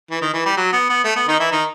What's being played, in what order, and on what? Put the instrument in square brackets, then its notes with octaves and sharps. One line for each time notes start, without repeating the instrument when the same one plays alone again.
[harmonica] E3
D#3
E3
G3
F#3
B3
B3
A3
B3
D#3 D#4
E3 E4
D#3 D#4